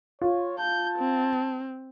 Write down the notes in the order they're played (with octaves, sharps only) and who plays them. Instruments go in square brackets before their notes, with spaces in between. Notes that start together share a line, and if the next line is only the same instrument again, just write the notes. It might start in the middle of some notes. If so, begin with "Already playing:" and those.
[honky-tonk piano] F4 [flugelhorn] C#5
[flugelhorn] A5 [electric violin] G6
[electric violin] C4